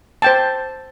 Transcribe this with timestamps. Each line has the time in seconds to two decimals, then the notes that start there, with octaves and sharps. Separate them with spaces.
0.22 C5 G5 A5